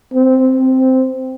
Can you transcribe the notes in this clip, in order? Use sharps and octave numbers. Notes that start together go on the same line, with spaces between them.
C4